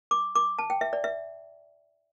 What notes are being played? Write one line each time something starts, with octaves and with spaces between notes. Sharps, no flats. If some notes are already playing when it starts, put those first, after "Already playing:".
D6
D6
A5
G5
E5
D5
E5